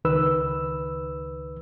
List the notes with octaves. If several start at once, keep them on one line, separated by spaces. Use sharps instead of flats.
C#2 D#3 B4 E6